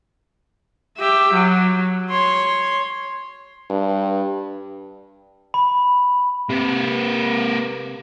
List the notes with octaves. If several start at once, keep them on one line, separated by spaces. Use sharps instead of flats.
G4 E5
F#3
C#5 C6
G2
B5
C3 A#3 B4